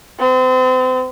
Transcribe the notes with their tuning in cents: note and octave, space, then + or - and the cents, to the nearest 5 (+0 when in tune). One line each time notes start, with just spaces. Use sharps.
C4 -35